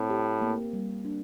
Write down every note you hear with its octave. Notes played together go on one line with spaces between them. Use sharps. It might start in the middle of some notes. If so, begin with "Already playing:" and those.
Already playing: A2 C4
G4
A#3
G3
D4